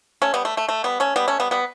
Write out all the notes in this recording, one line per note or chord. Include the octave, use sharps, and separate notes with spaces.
A3 C#4
G3 B3
A3
A3
A3
G3 B3
A3 C#4
G3 B3
A3 C#4
G3 B3
G3 B3